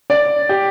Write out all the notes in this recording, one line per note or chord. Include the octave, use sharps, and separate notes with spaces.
D5
G4